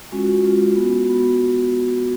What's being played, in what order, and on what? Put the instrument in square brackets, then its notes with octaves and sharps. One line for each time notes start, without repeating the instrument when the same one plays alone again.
[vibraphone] G#3 C#4 F4 F#4
G#3 C#4 F4
B3 F#4
B3 F#4